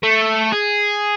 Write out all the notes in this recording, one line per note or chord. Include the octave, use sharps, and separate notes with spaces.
A3
G#4